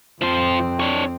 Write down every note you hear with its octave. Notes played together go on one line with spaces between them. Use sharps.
F2 F3 C4 C5
D4 C#5